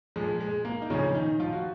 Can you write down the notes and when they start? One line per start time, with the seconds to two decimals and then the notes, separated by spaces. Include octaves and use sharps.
0.16 A#2 F3 G#3
0.41 G#3
0.65 A#3
0.82 D#4
0.90 A#2 C#3 F3 C#4
1.14 D#3 D#4
1.40 F3 F4
1.52 F#4